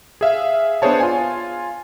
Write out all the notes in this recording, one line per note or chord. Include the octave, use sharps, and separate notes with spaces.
G#4 E5 F5
B3 D4 G#4 C5 C#5 A5
F4 G#5